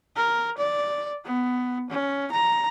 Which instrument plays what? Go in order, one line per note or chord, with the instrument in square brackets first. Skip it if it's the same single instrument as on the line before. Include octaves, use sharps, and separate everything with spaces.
[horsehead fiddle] A#4
D5
B3
C#4
A#5